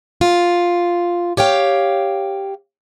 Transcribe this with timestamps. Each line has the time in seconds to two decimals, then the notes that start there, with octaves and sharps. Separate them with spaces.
0.21 F4
1.37 G4 C#5 F5 G5